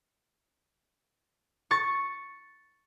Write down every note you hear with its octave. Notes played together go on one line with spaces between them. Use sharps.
C#6 A6